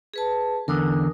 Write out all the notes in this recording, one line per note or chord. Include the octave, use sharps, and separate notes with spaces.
G#4 B4 A5
E2 D3 A#4 D#6